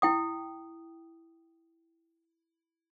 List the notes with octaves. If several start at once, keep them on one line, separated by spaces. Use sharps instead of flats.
E4 G5 D#6